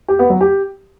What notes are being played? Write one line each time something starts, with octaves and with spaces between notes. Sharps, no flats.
G4
B3
F#3
G4